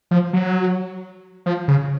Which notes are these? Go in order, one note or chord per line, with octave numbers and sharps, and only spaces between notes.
F3
F#3
F3
C#3